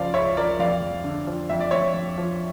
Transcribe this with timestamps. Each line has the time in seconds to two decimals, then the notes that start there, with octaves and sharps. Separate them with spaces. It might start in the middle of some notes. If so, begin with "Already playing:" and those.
Already playing: C#2 C#3 F3 D5 F5
0.14 C#2 C#5 E5
0.37 F3 A#4 D5
0.59 F2 D5 F5
0.81 F2
1.04 D3
1.27 F3
1.49 F2 E5
1.60 D5
1.71 F2 C#5 E5
1.94 F2
2.18 F3